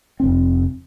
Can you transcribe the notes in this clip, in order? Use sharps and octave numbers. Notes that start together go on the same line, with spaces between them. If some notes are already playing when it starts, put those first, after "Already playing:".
F1 C4